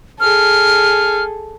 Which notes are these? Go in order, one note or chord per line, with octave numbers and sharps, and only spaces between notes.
G#4 A4 F6